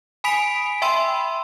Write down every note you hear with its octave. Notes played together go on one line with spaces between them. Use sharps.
G#5 B5 D#6 B6 D7 F7
E5 G5 B5 C6 E6 D#7